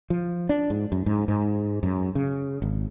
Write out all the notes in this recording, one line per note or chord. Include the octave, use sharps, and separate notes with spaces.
F3
D4
G#2
F#2
G#2
G#2
F#2
C#3
G#1